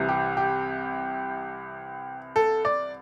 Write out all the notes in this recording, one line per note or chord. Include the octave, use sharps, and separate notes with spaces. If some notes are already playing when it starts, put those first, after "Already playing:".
Already playing: C2 C3 E3
G4
G4
A4
D5